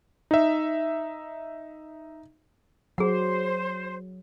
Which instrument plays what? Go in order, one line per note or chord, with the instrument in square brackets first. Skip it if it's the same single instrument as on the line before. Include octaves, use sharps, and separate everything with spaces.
[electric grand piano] D#4 E5
[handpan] F#3 [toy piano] G#4 F#5 [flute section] C5